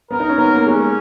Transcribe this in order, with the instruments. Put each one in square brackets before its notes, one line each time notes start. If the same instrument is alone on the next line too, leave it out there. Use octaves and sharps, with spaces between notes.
[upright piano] B3 [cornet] A#4
[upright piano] D#4
C#4
[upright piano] B3 [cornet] A#4
[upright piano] A#3
[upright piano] G#3 [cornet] C#4